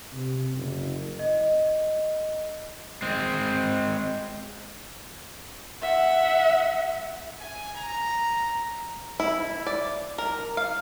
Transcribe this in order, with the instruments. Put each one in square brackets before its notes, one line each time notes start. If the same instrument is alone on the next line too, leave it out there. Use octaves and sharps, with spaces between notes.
[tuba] C3
F#1
[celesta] D#5
[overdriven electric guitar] G#3 C4
[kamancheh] E5 F#5
[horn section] G#5
A#5
[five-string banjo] E4
D5
A#4
F5